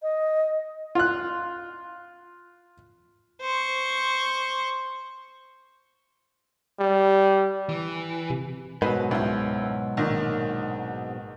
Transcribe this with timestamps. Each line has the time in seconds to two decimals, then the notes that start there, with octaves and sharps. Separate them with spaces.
0.02 D#5
0.95 F4 F#6
3.41 C5 C#6
6.80 G3
7.69 E3
8.30 C3
8.82 G#2 B2 F#3 B4
9.11 C#2 E4
9.97 A#1 D#3